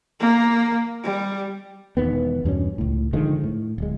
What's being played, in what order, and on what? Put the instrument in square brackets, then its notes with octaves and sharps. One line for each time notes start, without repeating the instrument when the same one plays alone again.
[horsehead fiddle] A#3
G3
[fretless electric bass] E1 E2 D#3 B3
E2 G2 B2 C#4
C#2 A2
D3 D#3 F3 G#3
A2
D1 G#3